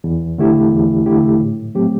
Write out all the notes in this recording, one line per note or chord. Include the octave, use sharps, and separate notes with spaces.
E2
D3 A3 E4 G4
E2
D3 A3 E4 G4
A2
F#3 A3 C4 G4